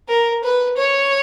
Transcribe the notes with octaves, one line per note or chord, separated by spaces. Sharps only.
A#4
B4
C#5